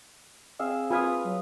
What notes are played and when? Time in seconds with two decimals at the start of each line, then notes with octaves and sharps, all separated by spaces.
0.59 C4 G#4 E5 F5
0.90 F4 B4 F5 G#5 B5 D#6
1.25 F#3